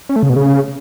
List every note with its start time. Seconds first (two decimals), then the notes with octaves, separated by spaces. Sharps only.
0.09 C#4
0.16 A3
0.23 C#3
0.29 B2
0.36 C#3